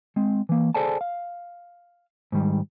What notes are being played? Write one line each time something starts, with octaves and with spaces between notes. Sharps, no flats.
G#3 C4
E3 A#3
G#4 A4 C5 D5 G#5 A5
F5
G#2 D#3 G3